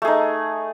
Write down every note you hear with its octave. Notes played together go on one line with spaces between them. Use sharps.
A3 D#4 G#4